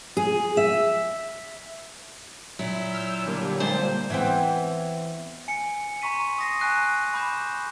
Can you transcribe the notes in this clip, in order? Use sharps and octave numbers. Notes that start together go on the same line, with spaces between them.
G#4
E5
A#2 F#3 E4
E6 F6 G6
D3 G3 A#3
G#3 C5 A5
E3 B3 C4
G#5 C#7
A#5 C6 C#6 B6 D#7
D#6 A#6 C7
G#5 A#5 C#6 F#6 C7 D#7
B5 D6 G6 E7